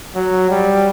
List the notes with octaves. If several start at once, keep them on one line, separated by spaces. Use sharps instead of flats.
F#3
G3